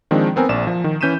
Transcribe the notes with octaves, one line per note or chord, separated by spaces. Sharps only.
D#3 F3 G#3 C4 D4
B3 C4 A#4 G#5
A#1 D5 E7
F3
D#3
E3 C#4 G6 B6 D#7 E7